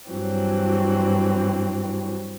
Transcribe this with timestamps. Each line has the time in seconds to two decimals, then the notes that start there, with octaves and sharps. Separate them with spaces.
0.10 G2 E3 F#3 C4